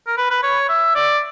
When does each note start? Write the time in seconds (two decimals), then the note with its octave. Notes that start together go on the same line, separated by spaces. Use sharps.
0.07 A#4
0.17 B4
0.31 B4
0.43 C#5
0.69 E5
0.95 D5